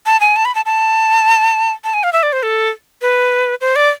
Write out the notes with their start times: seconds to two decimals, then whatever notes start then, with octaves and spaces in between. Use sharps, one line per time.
0.06 A5
0.21 G#5
0.36 A5
0.45 B5
0.55 A5
0.66 A5
1.84 A5
1.94 G#5
2.03 F5
2.13 E5
2.23 D5
2.33 C5
2.43 A4
3.02 B4
3.61 C5
3.76 D5